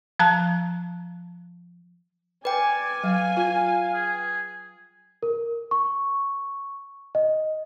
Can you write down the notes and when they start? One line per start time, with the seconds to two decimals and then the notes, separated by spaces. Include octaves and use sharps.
0.19 F3 A5 A#5 F#6
2.45 B4 D5 G5 G#5
3.04 F#3 F5
3.37 F4
3.94 G#4
5.23 A#4
5.71 C#6
7.15 D#5